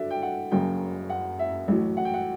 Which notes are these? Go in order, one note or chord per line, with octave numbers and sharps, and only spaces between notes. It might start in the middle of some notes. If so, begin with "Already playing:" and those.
Already playing: D3 F#3 D5 E5
G5
F#5
F#1 F#2 C#3 G5
F#5
E5
A1 A2 F#3
F#5
G5
F#5